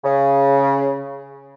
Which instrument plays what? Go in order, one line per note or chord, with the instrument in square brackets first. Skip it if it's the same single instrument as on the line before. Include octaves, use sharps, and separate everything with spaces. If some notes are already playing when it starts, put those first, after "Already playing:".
[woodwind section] C#3